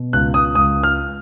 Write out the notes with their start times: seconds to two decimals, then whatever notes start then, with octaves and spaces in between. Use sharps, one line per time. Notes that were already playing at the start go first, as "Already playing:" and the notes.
Already playing: B2
0.13 C#2 F#6
0.34 D#6
0.55 C#2 D#6
0.83 F6